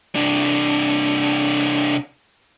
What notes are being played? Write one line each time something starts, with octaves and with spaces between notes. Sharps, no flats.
C2 D4